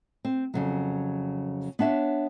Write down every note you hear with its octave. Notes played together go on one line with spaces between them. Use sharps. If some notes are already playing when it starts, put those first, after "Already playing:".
C4
F2 C#3 F#3
B3 D4 C#5 E5